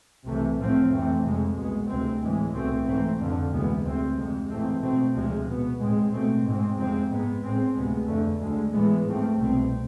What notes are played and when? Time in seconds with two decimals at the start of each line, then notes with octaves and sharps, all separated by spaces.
0.25 C2 C3 E3 A3
0.58 A2 F3 A3 C4
0.90 F2 C3 E3 A3 C4
1.23 F2 C3 G#3
1.55 C2 B2 G#3 B3
1.88 D2 C3 G#3 C4
2.21 A2 E3 G#3
2.54 C2 B2 A3 C4
2.86 G#2 E3 A3 C4
3.18 F2 D3 F3
3.51 D2 C3 E3 G#3 B3
3.84 D2 C3 G#3 C4
4.17 F2 C3 G#3
4.50 G#2 E3 A3 C4
4.81 B2 A3 C4
5.14 D2 C3 F3 G#3
5.46 B2 B3
5.80 A2 G#3 C4
6.12 B2 A3 C4
6.45 G#2 G#3 C4
6.77 F2 C3 G#3 C4
7.10 G#2 G#3 B3
7.43 A2 G#3 C4
7.76 D2 C3 G#3 B3
8.07 F2 D3 A3
8.40 D2 D3 G#3
8.73 A2 E3 G#3 B3
9.05 G#2 F3 A3 C4
9.38 C2 B2 A3 C4